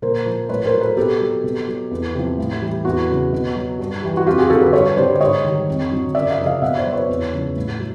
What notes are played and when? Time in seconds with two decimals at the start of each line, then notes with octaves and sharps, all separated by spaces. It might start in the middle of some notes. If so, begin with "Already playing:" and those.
0.02 A#2 A#4 C5
0.26 F3
0.49 A2 B4 C#5
0.66 A#4 C5
0.73 F#3
0.81 A4 B4
0.96 B2 G4 A4
1.20 F#3
1.44 B2
1.68 F#3
1.91 E2
2.14 C3 F3
2.38 A2
2.62 E3 G3
2.85 E2 F#4
3.08 C#3 F#3
3.33 B2
3.55 F#3
3.79 G2
4.03 E3 G3
4.17 F#4
4.27 F2 F4 G4
4.38 F#4 G#4
4.50 D3 F#3 G4 A4
4.62 A4 B4
4.73 G2 B4 C#5
4.97 D3 G3 C5 D5
5.16 D5
5.20 G#2 C#5 D#5
5.44 D#3 G3
5.68 F2
5.91 D3 F#3
6.15 F#2 D5 E5
6.30 D#5 F5
6.38 C#3 F3
6.46 D#5 F5
6.62 B2 E5 F#5
6.78 C5 D5
6.85 F#3
6.93 B4 C#5
7.09 E2
7.32 C#3 F3
7.56 A2
7.80 F#3